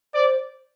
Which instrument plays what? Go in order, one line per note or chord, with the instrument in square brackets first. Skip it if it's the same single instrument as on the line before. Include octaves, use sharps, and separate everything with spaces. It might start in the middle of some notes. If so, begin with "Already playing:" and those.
[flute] C5 [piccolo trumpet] D5